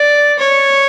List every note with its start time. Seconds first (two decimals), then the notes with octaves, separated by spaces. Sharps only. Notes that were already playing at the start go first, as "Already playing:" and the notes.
Already playing: D5
0.39 C#5